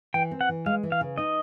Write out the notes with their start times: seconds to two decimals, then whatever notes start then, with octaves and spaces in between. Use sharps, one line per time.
0.14 E3 G5
0.31 C4
0.41 F#5
0.49 E3
0.66 G#3 F5
0.83 E3
0.92 F5
1.01 C#3
1.18 D#4 D#5